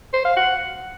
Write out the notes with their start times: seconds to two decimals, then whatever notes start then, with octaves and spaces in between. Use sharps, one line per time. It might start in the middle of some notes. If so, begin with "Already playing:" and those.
0.13 C5
0.25 F5
0.37 F#5